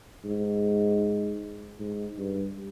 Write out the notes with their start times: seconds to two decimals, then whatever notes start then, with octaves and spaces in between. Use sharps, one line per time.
0.25 G#2
1.79 G#2
2.18 G2